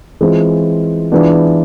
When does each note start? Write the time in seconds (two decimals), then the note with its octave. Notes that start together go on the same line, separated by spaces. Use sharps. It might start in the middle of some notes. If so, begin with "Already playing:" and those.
0.21 E3 G#3 C4 F4
1.12 E3 G#3 B3 D4 F4